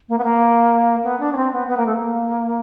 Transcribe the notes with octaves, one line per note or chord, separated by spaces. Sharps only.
A#3
B3
A#3
B3
D4
C#4
C4
B3
B3
A#3
A3
A#3